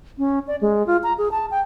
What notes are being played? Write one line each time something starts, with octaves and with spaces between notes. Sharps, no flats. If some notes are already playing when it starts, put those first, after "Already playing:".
C#4
D5
G#3
F4
A#5
G#4
A5
G5